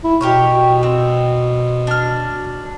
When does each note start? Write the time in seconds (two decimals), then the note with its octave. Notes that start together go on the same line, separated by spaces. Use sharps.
0.04 E4
0.21 B2 G4 A#4 C#5
0.83 C4
1.87 D4 F6